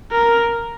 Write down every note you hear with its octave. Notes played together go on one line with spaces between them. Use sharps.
A#4